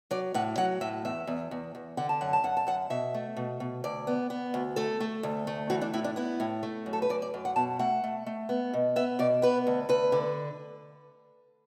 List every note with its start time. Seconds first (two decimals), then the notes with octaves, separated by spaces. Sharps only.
0.11 F#3 D5
0.34 A2 F#5
0.58 F#3 F#5
0.81 A2 E5
1.05 E2 E5
1.27 E2
1.51 E2
1.75 E2
1.97 D3 F#5
2.09 A5
2.21 F#2 F#5
2.33 A5
2.44 F#2 F#5
2.57 A5
2.67 F#2 F#5
2.90 B2 E5
3.14 A3
3.37 B2
3.60 B2
3.84 D2 D5
4.07 B3
4.30 B3
4.54 D2
4.76 A3 A4
5.00 A3
5.23 D2
5.47 A3
5.70 E3 F#4
5.81 D4
5.93 A2 E4
6.04 D4
6.16 B3 E4
6.40 A2
6.63 A3
6.86 F#2
6.93 A4
7.02 B4
7.09 F#2 D5
7.22 D5
7.34 F#2
7.45 F#5
7.56 B2 A5
7.79 A3 F#5
8.04 A3
8.26 A3
8.49 B3
8.73 B2
8.96 B3 E5
9.19 B2 D5
9.42 B3 B4
9.67 D2
9.89 D2 B4
10.12 D3